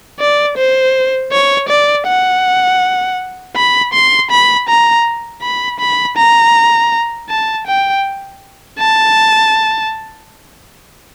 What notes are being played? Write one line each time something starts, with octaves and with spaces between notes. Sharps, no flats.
D5
C5
C#5
D5
F#5
B5
C6
B5
A#5
B5
B5
A#5
A5
G5
A5